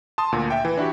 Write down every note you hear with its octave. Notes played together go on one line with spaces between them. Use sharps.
A5 C6 D#6
D2 A#2
E5 G5
E3
D4 E4 F#4 G4